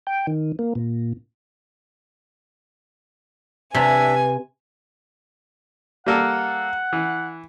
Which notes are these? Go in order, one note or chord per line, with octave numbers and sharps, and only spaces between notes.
G5
D#3
A#3
A#2
C3 D4 B4 E5 G#5
G3 A#3 A4 F#5
E3